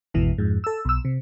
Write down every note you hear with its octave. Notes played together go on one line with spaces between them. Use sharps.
G#1 E2 B2 E3
F2 G#2
A4 E6
B1 E6
C3